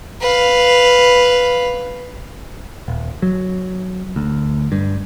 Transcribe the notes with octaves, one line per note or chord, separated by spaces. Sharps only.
B4 F5
D#1
F#3
D2
G2